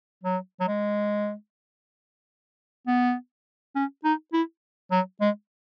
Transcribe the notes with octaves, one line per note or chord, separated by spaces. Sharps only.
F#3
F#3
G#3
B3
C#4
D#4
E4
F#3
G#3